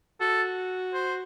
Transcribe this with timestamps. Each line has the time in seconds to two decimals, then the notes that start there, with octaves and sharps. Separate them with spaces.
0.20 F#4 A4
0.94 C5